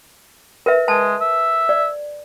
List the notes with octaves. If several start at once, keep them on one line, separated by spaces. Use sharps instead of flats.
A#4 B4 E5
G#3 A5
E5
D5